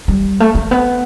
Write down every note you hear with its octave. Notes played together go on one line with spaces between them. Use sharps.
G3
A3
A3
B3